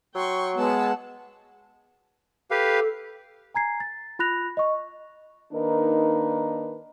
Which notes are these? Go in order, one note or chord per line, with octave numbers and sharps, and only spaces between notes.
F#3 G5 C6 C#6
G#3 B3 F#5 A5 E6
G4 A4 B4 F5
G#5 A#5 G#6 C7
A6
F4 B5 F#6 A#6 F7
D#5 C#6
D#3 A#3 D4 D#4 A#4 B4